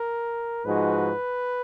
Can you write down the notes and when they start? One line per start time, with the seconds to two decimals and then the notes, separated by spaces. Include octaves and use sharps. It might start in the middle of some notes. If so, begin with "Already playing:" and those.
Already playing: A#4
0.65 G#2 F3 G#3 D#4 F#4 B4